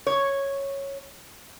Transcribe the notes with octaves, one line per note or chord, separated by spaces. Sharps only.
C#5